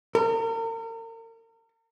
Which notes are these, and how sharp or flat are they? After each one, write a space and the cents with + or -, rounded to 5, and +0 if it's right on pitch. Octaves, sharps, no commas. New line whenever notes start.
A#4 -40